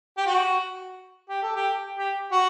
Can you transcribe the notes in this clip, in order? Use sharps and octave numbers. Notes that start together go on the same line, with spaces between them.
G4
F#4
G4
A4
G4
G4
F#4